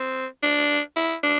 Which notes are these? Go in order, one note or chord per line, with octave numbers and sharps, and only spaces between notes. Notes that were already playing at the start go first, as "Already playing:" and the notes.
Already playing: C4
D4
E4
D4